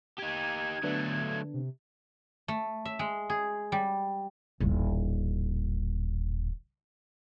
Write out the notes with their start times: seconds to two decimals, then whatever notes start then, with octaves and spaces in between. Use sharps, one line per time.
0.19 D#4 G4 G#6
0.83 D3 F#3 A3 B3 D4
1.54 C3
2.48 A3
2.85 E5
2.99 G#3
3.30 G#4
3.72 G3
4.60 D#1 A1